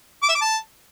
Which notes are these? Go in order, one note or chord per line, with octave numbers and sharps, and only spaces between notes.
D6
E5
D6
A5